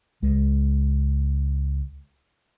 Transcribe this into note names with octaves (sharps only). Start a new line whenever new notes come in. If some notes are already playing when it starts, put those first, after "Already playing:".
C#2 G#3